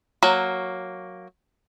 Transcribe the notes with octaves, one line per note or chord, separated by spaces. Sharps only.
F#3 A#3